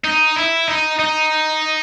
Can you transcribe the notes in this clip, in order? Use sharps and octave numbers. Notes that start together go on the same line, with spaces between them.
D#4
E4
D#4
D#4